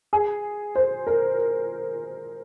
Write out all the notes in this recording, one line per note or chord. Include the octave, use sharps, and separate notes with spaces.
G#4
C5
A#4